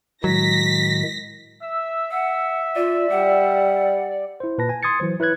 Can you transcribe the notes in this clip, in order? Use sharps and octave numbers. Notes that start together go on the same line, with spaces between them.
A2 D#3 F#3 G#3 A#6 B6
E5 E6
E5 F#5
F4 D5
G3 F#5
E4 C5
A#2 B4 A5 A#6
G#5
C6 D#6 G#6 A6 C#7
E3 F#3 C5
E4 B4 C#5 F#6 G#6